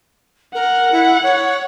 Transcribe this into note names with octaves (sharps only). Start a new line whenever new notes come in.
A#4 F#5
E4
C#5